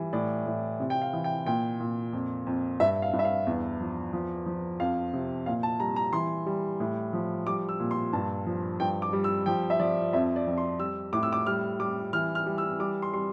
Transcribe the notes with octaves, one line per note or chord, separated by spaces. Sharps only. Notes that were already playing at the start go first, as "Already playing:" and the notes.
Already playing: E3 G3
A2 D5
A2
C3
G5
F5
E3
G5
A#2 G5
A#2
F2
F2
G2 E5
F5
G2
E5
F5
E2
F3
F3
F3
F2 F5
C3
A#2 F5
A5
G3 A#5
A#5
E3 C6
G3
A2
F3
G3 D6
E6
A#2
C6
G2 A5
F3
G2 G5
D6
G3
E6
F3 G5
E5
F3 D5
F2 E5
D5
F2
C6
G3 E6
A2 D6
E6
D6
G3 F6
G3 D6
E3 F6
F6
G3
E6
G3 D6
C6
G3 C6